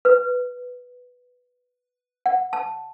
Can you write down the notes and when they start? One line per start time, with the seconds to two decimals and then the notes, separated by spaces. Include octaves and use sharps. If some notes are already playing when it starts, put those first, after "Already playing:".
0.05 B4
2.26 F#5
2.53 A5